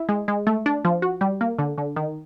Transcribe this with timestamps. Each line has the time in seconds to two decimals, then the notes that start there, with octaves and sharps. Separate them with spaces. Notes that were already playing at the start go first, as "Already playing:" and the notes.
Already playing: E4
0.09 G#3
0.28 G#3
0.47 A3
0.66 D4
0.85 F3
1.02 F#4
1.21 G3
1.41 A#3
1.59 D3
1.78 D3
1.96 D#3